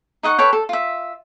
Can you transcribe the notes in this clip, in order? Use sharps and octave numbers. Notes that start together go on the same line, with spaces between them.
D#4 D#5 F#5 C#6
A4 B4 C#5 G5
A4
F4 E5